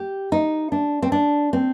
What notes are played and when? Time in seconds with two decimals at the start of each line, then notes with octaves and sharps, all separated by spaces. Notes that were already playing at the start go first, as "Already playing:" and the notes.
Already playing: G4
0.32 D#4
0.72 D4
1.02 C4
1.12 D4
1.53 C4